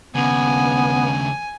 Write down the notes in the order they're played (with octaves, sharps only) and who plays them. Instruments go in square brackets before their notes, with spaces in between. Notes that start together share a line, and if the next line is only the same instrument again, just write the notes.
[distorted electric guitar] D#2 C#3 [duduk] B3 [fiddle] G#5